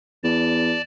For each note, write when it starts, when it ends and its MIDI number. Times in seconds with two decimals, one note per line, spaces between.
0.24 0.77 40
0.24 0.82 74
0.24 0.82 81